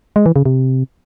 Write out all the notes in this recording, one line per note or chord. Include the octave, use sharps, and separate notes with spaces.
G#3
E3
C#3
C3